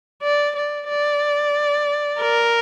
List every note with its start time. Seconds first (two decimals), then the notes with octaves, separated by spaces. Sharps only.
0.22 D5
0.56 D5
0.89 D5
2.21 A#4